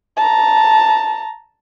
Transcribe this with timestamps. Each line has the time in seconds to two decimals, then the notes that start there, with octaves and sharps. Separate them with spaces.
0.17 A5 A#5